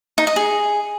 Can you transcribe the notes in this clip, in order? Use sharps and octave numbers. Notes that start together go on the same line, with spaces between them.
D#4
D#5
G#4